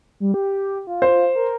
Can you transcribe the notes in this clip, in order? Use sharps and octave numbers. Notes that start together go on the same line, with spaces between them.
G3
G4
F4
C5
A#4